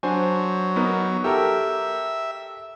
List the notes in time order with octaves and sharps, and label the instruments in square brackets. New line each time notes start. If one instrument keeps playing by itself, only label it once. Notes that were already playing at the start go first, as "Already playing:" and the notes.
[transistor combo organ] F#3 [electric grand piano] D4 C5 G#5
[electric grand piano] B3 D#4 A#4
[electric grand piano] G4 A4 A#4 [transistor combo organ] E5